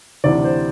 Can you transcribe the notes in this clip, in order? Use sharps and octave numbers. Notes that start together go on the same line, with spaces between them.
D2 C3 E3 D5
C5